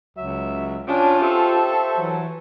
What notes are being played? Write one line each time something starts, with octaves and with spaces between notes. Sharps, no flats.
C#2 F#3 E5
C#4 D4 F4 G5 D6 D#6
G4 A4 C5 E5 C#6
E3 F#3